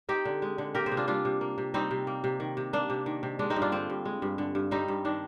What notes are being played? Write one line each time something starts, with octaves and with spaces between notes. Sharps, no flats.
C4 D#4 G4
D3
G#3
D3
A#3 G4 A#4
G#4 C5
C3
D4 F4
G3 D4 F4
C3
A#3
C3
G3 C4 D#4
C3
A#3
C3
D#3
C3
A#3 D4
C3
D#3
C3
G#3 D4
C4 D#4
G2
D4 F4
D3 C4
G2
G#3
G2
D3
G2
G3 C4 D#4
G2
D#3 D4